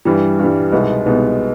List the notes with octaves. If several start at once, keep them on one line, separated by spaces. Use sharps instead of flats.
G2 E3 G3
G2 E3 G3
C2 B2 G#3 B3 D#4
C2 B2 G#3 B3 D#4